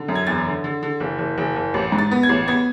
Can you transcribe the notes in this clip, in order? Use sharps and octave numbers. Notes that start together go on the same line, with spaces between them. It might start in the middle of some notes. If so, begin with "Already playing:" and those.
Already playing: D3
F#2
G#6
E2 A6
D3
D3
D3
F#1
F#1
F#1
F#1
A1
G#2
A6
B3
G#6
A1
B3 G#6